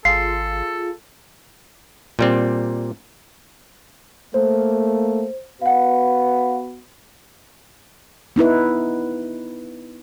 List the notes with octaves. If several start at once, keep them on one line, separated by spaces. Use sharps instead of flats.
G#1 F4 G#4 A4 C7
A#2 G3 C4
A3 A#3 C5
B3 F#4 B4 F5 F#5
B3 D#4 E4 B4